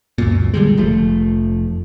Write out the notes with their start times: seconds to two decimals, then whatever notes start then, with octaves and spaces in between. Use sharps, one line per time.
0.18 C#2 F#2 A#2
0.54 D3 G3 G#3
0.77 F1 F3 A3